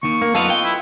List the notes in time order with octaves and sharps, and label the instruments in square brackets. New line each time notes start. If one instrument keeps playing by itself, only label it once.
[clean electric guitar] D#2 D#3 [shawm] C#6
[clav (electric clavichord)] A#3
[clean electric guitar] F#2 B3 F5 [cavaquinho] F4 B4 D#5 [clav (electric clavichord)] A4
[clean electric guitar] G5
[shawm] E4